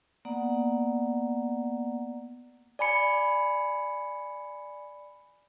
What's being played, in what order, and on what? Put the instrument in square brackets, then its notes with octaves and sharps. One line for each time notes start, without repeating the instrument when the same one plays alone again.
[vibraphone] A#3 B3 D5 F#5 A#5
[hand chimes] D5 G#5 B5 C#7